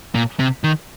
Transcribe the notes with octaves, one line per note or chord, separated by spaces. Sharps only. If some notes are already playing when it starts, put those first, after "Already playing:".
A#2
C3
D#3